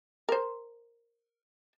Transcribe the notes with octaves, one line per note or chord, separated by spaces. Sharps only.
A#4 C5